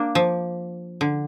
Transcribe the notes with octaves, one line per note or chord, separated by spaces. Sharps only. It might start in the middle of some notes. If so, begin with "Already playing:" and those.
Already playing: A#3 D4
F3
D3